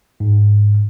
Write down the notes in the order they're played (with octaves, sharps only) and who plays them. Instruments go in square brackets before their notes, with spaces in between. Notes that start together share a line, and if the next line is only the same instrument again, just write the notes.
[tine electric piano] G#2